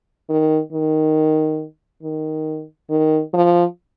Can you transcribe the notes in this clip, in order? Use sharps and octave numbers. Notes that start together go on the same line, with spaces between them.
D#3
D#3
D#3
D#3
F3